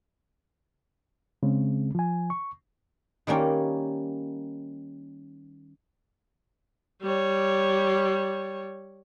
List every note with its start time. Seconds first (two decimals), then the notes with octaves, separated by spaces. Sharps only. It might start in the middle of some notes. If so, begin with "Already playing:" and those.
1.43 C#3 G#3 C4
1.95 F3 G#5
2.30 C#6
3.27 D#3 G3 A#3 C#4 D#4
7.03 G3 C#5